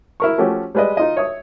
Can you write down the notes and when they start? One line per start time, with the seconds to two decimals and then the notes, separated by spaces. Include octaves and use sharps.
0.20 E4 A#4 C#6
0.38 F3 A3 C#4 F#4 G4
0.75 G3 G#3 B4 D5 D#5
0.97 D#4 F4 D#5
1.17 C#5 E5 D#6